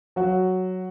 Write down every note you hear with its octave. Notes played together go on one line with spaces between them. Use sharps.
F#3 F#4